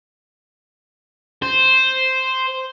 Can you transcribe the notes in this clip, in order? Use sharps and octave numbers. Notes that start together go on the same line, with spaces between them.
C5